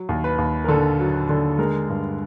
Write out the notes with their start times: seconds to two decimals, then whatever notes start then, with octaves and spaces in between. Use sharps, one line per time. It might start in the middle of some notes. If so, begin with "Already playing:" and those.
Already playing: F#3
0.09 D#2
0.24 B4
0.38 D#2
0.64 A#4
0.68 D3 A4
0.99 F#3
1.29 D3
1.58 G#3 A#4
1.89 G2